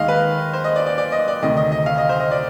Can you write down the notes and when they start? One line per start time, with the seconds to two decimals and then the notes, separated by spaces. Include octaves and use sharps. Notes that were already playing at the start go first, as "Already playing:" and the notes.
Already playing: D#2 D#3 G#3 D#5 F5
0.08 B4
0.53 C5
0.64 D#5
0.76 D5
0.87 D5
0.98 D5
1.12 D#5
1.28 D5
1.42 D2 C3 D#3 D#5
1.57 D#5
1.72 D#5
1.86 F5
1.98 D#5
2.09 C5
2.20 D#5
2.31 D5